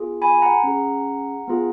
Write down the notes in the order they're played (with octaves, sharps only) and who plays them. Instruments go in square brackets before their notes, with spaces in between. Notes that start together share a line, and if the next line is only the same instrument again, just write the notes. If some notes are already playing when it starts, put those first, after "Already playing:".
Already playing: [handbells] B3 F4 G#4
G#5 B5
F#5 A#5
C#4 G#4
B3 F4 G#4